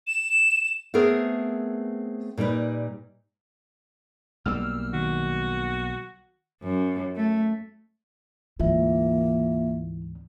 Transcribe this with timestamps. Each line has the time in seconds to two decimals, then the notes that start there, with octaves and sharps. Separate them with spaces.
0.07 E7
0.94 A3 B3 C4 G#4 A#4
2.37 A#2 G3 D#4 B4
4.46 B1 G3 A#3 E6 F6
4.94 D#3 F#4
6.62 F#2
7.16 A3
8.60 D2 G#2 E3 A#3 F4 E5